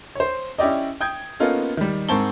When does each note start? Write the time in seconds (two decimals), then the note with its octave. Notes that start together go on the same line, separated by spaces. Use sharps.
0.15 C5 C#5
0.58 C#4 E4 G4 D5 D#5
1.01 G5 D#6 G6 G#6
1.40 A#3 B3 C#4 D#4 F4 A4
1.77 D#3 G3
2.09 G#2 C4 A#4 A5 C#6 G7